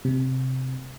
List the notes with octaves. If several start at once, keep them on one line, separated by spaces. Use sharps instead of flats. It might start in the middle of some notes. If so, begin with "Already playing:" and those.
C3